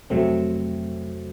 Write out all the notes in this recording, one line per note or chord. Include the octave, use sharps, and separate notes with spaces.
F2 C3 F#3 A3 C4